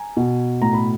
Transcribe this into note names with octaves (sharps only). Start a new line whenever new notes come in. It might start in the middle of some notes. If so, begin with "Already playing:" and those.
Already playing: G#5 A#5
B2
A2 A#5
B5